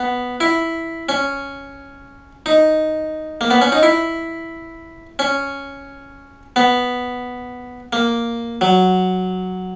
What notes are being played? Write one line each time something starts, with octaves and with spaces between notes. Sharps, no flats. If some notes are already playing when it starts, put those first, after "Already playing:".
Already playing: B3
E4
C#4
D#4
A#3
B3
C#4
D#4
E4
C#4
B3
A#3
F#3